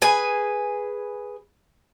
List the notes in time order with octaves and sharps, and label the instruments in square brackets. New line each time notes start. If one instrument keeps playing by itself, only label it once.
[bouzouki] G#4 B4 G#5